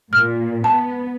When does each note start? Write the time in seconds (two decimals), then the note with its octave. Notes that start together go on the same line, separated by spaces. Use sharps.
0.13 A#2 F6
0.64 B3 A5